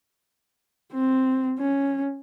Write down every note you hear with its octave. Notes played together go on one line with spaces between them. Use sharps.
C4
C#4